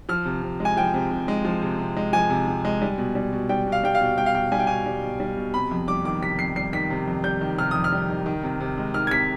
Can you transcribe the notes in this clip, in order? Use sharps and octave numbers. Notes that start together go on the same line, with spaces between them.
F3 F6
C3
C3
G#3
G#5
F3 G5
C3
C3
G#3
F3
C3
C3
G#3
F3 G#5
C3
C3
G#3
G3
B2
G3
B2
G3 G5
B2
F5
G3 G5
F5
B2
G3 G5
F5
B2 G5
G3 G#5
G5
B2 G#5
G3
B2
G3
B2
C3 B5
F2
G3 D6
D#3 D6
C3 B6
F2 C7
G3 C7
D#3 B6
C3
F2
G3 G6
D#3
C3 F6
F2 D#6
F6
G3
D#3
D#3
C3
C3
G#3
D#3 F6
G#6
C3 B6